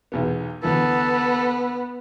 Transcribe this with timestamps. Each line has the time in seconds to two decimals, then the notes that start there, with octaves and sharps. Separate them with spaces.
0.12 B1 E2 B3
0.63 D2 E3 B3 A4